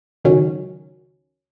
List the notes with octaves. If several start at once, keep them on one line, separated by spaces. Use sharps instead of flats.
C#2 D#3 F#3 C#4